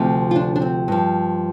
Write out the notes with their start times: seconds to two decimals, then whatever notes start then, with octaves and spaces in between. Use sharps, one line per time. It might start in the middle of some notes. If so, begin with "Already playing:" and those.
Already playing: D2 C3 F3 F4
0.31 F4
0.36 D4
0.56 D4
0.62 C4
0.88 G2 F3